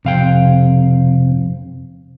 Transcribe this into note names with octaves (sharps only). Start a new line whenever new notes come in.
F2 C3 F5 G5